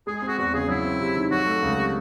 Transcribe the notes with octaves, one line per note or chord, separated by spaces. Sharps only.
G#3 G#4
G#4
C4
F#4
E2 F#4
C#3 G#4
F#3 E4
C4
C3
D#3
F#3 F#4
A3
C#2
C3